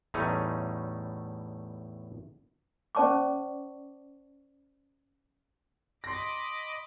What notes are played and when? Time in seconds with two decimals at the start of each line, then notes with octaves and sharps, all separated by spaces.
0.14 E2 A2 G3 A3 C#4 D#4
2.95 C#4 C5 D5 A5 C#6 D6
6.04 D#5 B5 C6 D6 A#6